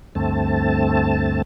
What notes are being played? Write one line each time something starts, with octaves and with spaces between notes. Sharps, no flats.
D2 G2 A3 C4 A5